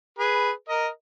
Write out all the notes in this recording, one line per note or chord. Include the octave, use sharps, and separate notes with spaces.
G#4 B4
A#4 D#5